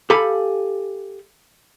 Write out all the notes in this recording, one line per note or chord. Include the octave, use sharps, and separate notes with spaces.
G4 A4 F5 G#5 B5